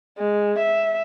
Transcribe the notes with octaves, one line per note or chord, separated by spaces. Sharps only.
G#3
E5